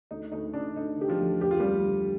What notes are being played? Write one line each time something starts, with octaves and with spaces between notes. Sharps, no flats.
D2 D#4
D2 D#4
D2 D4
D2 D#4
D3 G4
F3 F4
D2
F1 G4
F4
F3 G3 G4
D3